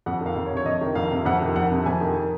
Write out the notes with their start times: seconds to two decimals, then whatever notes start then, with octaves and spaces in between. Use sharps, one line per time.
0.06 F2 F#5
0.21 D#3 F5
0.36 F2
0.46 C#5
0.51 C3
0.57 C#5
0.66 F2 D#5
0.81 D#3
0.95 F2 F5
1.11 C3
1.25 F2 F#5
1.41 D#3
1.55 F2 F#5
1.71 C3
1.86 F2 G#5
2.01 D#3